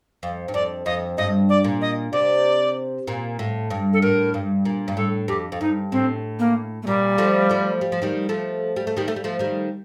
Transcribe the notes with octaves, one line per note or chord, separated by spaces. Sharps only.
F2
G2
F2 D5
F2 D#5
G2 D#5
D5
A#2
D#5
C3 D5
A#2
A2
G2
A4
A2 A#4
G2
A#2
G2
A2 A4
F2 G4
F2
G2 D#4
A2 C4
A#3
A3
A#2 G3
F3 A3
F3 A3
G3
F3
D#3 G3
F3 A3
G3
A3
D#3 G3
A3
G3
F3 A3
D#3 G3